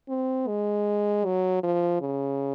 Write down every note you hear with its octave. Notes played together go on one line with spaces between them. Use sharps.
C4
G#3
F#3
F3
C#3